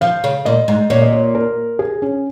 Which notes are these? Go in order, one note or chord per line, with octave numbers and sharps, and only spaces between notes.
F3 F5
C#3
A#2 D#5
G#2
A#2 C#5
D#5
C#5
A#4
G#4
C#4